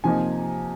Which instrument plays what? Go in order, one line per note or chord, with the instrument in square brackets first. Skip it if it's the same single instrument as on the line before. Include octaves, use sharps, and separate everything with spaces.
[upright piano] C3 F3 A#3 D#4 G#5